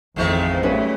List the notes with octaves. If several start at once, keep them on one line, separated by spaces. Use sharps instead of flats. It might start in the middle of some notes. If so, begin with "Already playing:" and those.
A1 F2 D#3 F3 G#3 A3
F#2 G3 A3 C#4 B4